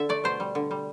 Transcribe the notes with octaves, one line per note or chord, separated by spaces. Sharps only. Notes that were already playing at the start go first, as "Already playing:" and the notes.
Already playing: D3 A4 E5
A3 D5
B2 C5
G3
D3
G3